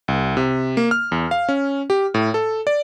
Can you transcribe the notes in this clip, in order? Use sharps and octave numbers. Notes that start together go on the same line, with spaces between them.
C2
C3
A#3
F6
E2
F5
C#4
G4
A2
A4
D5